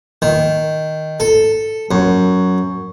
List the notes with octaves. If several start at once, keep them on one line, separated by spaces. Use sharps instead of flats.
D#3
A4
F#2